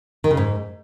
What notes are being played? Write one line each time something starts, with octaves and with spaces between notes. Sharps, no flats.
D#3
C#3
G#2